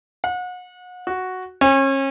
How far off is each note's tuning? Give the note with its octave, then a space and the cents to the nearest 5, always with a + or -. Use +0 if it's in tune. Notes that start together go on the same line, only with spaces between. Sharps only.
F#5 -35
F#4 +0
C#4 -35